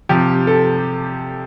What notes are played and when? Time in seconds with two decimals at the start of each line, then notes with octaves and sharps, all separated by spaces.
0.09 C3 F3 G4
0.47 A4